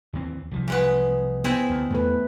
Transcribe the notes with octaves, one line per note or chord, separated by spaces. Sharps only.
D#2 E3 C4
C2 E3 F3
C#3 G#3 B3
B3 C4 E4 G#4
D2
E2 E3 A3 B4